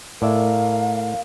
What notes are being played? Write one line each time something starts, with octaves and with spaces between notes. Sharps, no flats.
A2 A#4 D5 E5 F5